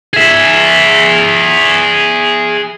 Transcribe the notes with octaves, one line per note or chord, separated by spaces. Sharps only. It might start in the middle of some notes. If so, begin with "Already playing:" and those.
G#4 E5